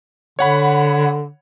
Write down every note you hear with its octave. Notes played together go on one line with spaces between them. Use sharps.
D3 C#5 F#5 B5